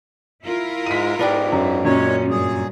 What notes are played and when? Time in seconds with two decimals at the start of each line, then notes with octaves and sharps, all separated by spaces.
0.44 E4 F4 A#4
0.86 G#2 G#3 B6 D#7
1.19 G#2 B3 D4 G4
1.52 F#2
1.85 F#2 A#2 G#3 C#4 C#5
2.30 G2 G#4